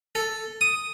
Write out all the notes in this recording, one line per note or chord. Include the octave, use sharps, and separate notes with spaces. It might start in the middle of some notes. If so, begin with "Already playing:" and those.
A4
D#6